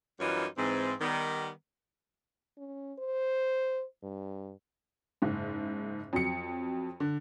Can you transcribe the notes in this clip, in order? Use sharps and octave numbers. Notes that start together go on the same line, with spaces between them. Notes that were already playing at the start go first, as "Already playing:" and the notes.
F#2 E3 G3 D#4 F4 C#5
G#2 E3 C4
D#3 G3 B3
C#4
C5
G2
F#1 G#2
F2 F#3 C#7
D3